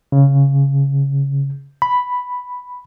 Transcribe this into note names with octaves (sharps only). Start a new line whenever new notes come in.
C#3
B5